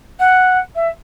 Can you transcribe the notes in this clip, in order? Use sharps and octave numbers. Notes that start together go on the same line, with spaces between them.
F#5
E5